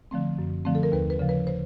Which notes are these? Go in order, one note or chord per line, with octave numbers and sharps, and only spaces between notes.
D3 F3 A3 C4
F#2
D3 F3 A3 C4
A4
A#4
D#2 B4
B4
C#3 F3
B4
C5